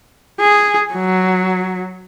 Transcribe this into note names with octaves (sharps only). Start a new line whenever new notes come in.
G#4
F#3